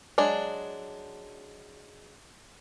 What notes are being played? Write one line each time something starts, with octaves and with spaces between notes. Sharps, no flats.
F#3 G#3 D4